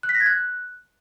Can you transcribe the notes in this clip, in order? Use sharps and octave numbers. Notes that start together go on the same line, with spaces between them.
F#6
B6
A#6
G#6
F#6